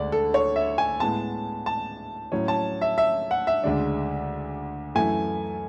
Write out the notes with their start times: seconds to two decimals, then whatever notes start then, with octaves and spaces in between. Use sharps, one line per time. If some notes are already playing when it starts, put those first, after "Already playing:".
Already playing: D2 D3 G#3 D4 D5
0.12 A4
0.34 C#5
0.56 E5
0.78 G#5
1.00 A2 G#3 B3 A5
1.66 A5
2.32 A2 F#3 C#4
2.48 A5
2.81 E5
2.98 E5
3.31 F#5
3.47 E5
3.64 D2 C#3 G#3 D4
4.95 F#2 E3 A3 E4 G#5